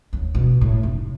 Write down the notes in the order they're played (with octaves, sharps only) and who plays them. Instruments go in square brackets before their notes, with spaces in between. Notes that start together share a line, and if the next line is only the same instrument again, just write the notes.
[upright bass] D#2
B2
A2
F1